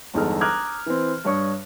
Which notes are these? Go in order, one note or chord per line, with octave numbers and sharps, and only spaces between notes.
G1 E2 G#3 D#4 A4 F6
A#5 D6 D#6 F6 F#6 G#6
E3 C4
G2 D4 C#5 C#6 D#6